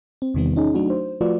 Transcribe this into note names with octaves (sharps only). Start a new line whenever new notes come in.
C4
E2 C3 D#3 G3 B3
C#4 D#4 G#4
F#3 A3 D4 D#4 F#4
C5
F3 A3 F4 F#4 B4 D5